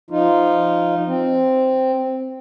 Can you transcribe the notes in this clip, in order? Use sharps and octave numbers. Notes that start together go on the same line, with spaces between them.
F3 D#4 F4
C4